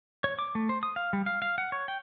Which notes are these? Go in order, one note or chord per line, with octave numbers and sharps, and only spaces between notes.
C#5
D6
A3
C5
D#6
F5
G3
F5
F5
F#5
C#5
G5